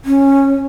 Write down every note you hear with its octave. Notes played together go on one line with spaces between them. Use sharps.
C#4